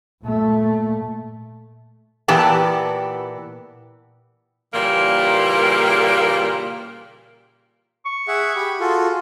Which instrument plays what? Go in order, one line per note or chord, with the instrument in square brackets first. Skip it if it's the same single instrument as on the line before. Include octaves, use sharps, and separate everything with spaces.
[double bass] A#2 A3
[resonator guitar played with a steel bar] A#2 E3 B3 G4 A5
[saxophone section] A#2 C#3 E3 G3 A#3
[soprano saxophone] C#6
[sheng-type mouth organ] G#4 E5 F#5
G4 B5
[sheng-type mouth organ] F4 F#4 A4 [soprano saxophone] G#4